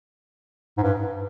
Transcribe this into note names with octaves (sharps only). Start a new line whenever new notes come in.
G#2
G2